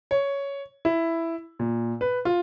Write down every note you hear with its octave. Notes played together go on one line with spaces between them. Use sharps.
C#5
E4
A#2
B4
F4